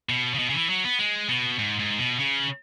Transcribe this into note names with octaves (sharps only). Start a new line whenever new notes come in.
B2
C#3
B2
C#3
E3
F#3
B3
G#3
B2
G#2
G#2
B2
C#3